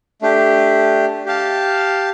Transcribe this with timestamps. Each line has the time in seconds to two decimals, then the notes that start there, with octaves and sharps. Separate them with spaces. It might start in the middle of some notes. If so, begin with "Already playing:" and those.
0.22 A3 D4 G4
1.26 G4 F5 A5